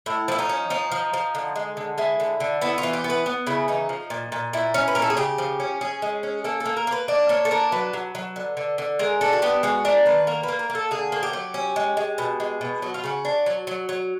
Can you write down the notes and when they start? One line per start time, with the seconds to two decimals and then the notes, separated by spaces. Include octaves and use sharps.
0.06 A2 E4
0.28 F3 E4
0.39 D#4
0.49 C#4
0.70 F3 D#4
0.92 F3
1.13 F3
1.35 D3
1.56 G#3
1.77 D3
1.98 G#3 E4
2.20 D3
2.40 D3
2.61 B3 E4
2.78 F4
2.83 E3
2.93 G4
3.04 B3
3.10 B4
3.26 B3
3.47 C#3 E4
3.68 E3 D#4
3.89 F3
4.10 A#2
4.32 A#2
4.53 A#2 E4
4.74 C#4
4.88 B4
4.95 A#2 A#4
5.02 A4
5.10 G#4
5.17 C#3 G4
5.38 F3
5.60 C#4
5.81 C#4 G#4
6.02 G#3
6.23 C#4
6.44 A#3 A4
6.60 A4
6.66 A#3
6.77 A#4
6.87 A#3
6.92 B4
7.08 D4 D5
7.29 A#3 C#5
7.45 A4
7.51 D4 A#4
7.72 F#3 B4
7.93 F#3
8.15 F#3
8.36 D3
8.57 D3
8.78 D3
8.99 G#3 A#4
9.21 D4 A4
9.33 F#4
9.42 B3 G4
9.63 G#3 F#4
9.85 D4 A#4
10.06 D#3 B4
10.27 A#3 A#4
10.43 A#3 B4
10.59 A#4
10.70 A#3
10.75 A4
10.91 D3 G#4
11.12 A#3
11.23 G4
11.33 F#3
11.54 C#4
11.76 G#3
11.97 G#3
12.18 B2
12.40 G#3
12.61 B2
12.82 F#3 F#4
12.94 F4
13.04 C#3 F#4
13.25 D4
13.46 F#3
13.67 F#3
13.89 F#3